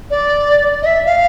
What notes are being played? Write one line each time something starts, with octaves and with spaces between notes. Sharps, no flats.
D5
D#5
E5
F5